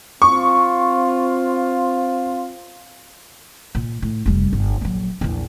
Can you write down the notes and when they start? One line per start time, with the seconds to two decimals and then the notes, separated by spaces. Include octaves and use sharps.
0.22 C4 F4 C#6
3.75 A#2
4.02 A2
4.26 F1 G3
4.53 G1
4.81 A#1 F#3
5.21 A#1 E2